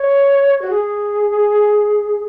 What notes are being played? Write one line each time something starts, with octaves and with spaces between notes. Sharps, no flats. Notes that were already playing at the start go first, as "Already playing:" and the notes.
Already playing: C#5
F#4
G#4